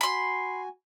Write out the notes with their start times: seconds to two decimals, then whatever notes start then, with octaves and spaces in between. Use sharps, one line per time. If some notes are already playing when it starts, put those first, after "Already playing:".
0.01 F#4 G#5 B5 C6